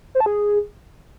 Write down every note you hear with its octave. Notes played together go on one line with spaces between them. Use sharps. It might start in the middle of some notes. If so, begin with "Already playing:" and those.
C5
A5
G#4